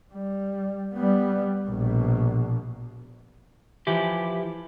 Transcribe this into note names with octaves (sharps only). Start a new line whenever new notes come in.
G3
G3 B3
A#1 B2
E3 F3 E4 G4